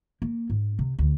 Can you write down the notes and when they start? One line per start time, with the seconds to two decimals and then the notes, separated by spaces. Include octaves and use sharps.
0.22 A#3
0.50 G#2
0.79 C3
0.99 D2